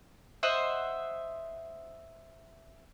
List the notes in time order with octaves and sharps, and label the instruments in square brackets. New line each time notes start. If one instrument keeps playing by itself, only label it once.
[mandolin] C5 D#5 E5 F#5